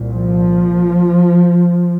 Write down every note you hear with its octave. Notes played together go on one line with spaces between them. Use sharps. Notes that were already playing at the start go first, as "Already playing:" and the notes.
Already playing: C2 A#2
F3